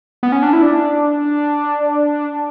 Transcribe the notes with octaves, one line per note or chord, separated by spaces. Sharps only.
B3
C#4
D4
E4
D4